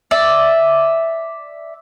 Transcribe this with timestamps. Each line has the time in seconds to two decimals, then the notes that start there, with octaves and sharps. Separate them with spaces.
0.11 D5 E5